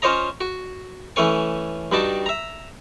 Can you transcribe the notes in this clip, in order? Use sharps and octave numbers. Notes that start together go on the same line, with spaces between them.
C#4 F4 C5 C#5 D#5 A#5
F#4
E3 A3 C#4 C#5 G#5
G2 G3 D#4 F#4 A5
E5 A#5